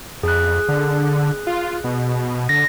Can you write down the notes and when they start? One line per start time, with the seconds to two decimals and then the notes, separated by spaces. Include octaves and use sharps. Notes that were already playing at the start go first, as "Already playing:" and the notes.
0.23 F2 G#4 F#6
0.69 D3
1.47 F4
1.84 B2
2.49 D3 A#6